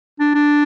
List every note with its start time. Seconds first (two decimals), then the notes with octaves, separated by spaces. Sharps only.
0.20 D4
0.35 D4